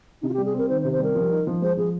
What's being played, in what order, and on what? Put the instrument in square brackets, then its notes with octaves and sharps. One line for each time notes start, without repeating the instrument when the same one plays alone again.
[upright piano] C3 [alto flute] D#4
[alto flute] F4
G4
[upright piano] G3
[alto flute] G#4
[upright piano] C4 [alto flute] A#4
[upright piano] D#3 [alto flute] C5
[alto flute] C5
[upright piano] C3
[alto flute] C5
[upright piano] G3 [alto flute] A#4
[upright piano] F3
D#4
F3
[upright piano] G#3 [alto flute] C5
[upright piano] F3 [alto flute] G#4